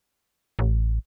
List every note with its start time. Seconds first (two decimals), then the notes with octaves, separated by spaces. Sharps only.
0.59 A1